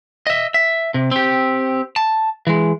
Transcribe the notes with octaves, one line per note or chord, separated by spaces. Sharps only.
D#5 E5
E5
C3
C4 G4
A5
E3 G#3